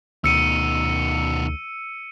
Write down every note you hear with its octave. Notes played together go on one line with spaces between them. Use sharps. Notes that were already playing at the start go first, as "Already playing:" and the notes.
D2 B2 D#3 E6 C#7 D#7